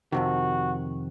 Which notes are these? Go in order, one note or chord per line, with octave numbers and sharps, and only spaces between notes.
F2 C3 D#3 F#4